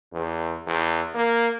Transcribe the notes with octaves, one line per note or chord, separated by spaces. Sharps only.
E2
E2
A#3